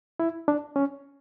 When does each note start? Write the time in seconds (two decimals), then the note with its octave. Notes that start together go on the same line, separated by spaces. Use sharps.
0.20 E4
0.48 D4
0.76 C#4